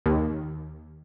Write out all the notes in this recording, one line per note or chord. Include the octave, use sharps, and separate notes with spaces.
D#2